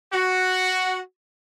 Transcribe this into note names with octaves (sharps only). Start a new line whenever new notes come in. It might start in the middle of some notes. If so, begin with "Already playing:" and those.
F#4